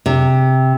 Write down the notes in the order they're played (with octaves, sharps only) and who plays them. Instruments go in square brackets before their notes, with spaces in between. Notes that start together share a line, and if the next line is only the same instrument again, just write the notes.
[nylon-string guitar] C3